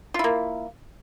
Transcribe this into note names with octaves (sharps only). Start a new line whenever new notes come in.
A#3 E4 F4